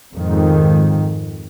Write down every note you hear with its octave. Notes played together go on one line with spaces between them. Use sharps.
F2 G#2 D#3